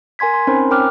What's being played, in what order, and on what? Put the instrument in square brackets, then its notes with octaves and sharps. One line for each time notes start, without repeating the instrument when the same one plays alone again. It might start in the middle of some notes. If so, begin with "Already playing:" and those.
[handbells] A#4 G#5 C6 G#6 B6
C6
C4 C#4 D#4 A#4 C5 B5
A#4 C#5 G5 D6 F6 F#6